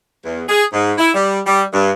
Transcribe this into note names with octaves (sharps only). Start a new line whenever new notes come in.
E2
G#4
G#2
E4
G3
G3
G2